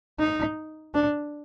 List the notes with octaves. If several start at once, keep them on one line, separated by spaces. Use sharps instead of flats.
D#4
D4